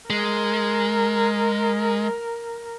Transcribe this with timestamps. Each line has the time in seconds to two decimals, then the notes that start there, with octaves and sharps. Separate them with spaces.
0.10 G#3 A#4